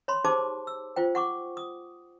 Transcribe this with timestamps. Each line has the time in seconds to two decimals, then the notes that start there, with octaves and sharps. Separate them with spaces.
0.08 C#5 B5 C6
0.24 D#4 G4 G#4 C5 A5 D6
0.67 E6
0.96 F4 C5 G5
1.15 F#5 C#6 D6
1.57 D#6